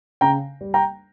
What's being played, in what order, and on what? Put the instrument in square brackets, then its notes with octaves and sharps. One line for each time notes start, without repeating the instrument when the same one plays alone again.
[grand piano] C#3 G5 A#5
G3
G5 A#5